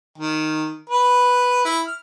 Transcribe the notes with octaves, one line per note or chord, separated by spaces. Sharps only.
D#3
B4
E4
F6